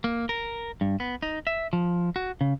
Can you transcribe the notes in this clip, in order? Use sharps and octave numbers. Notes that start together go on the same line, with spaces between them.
A#3
A#4
G2
B3
D#4
E5
F3
F#4
C#3